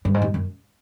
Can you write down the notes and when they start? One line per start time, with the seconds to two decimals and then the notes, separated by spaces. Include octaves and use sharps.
0.05 G2
0.14 G#2
0.22 G2
0.34 F#2